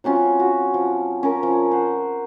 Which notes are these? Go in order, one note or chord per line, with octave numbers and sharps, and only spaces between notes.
F#3 C4 C#4 F4
F#4
F3
C#4 A#4
F3
C5 F#5